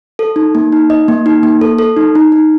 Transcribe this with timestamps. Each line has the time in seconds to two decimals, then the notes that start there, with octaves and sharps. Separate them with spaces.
0.19 A4
0.36 D#4
0.55 A#3
0.72 D#4
0.90 D#5
1.08 A#3
1.26 D#4
1.43 A#3
1.61 A4
1.79 A4
1.97 D#4
2.15 D#4
2.32 D#4